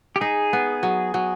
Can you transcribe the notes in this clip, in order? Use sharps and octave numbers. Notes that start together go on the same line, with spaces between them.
G4
D#4 G#4
B3
F#3
F#3